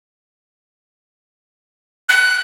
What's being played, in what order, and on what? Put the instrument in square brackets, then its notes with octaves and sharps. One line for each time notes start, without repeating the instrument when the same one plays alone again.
[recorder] F#6